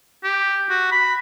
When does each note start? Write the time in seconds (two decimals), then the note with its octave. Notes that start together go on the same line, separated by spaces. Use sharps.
0.24 G4
0.70 F#4
0.92 B5